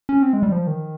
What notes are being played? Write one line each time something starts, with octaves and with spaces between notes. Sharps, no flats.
C#4
C4
G#3
G3
F3
D#3